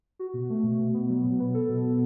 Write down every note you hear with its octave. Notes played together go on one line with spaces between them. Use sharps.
F#4
B2
A3
B2
B2
B3
F#3
B2
B3
A4
B2
B2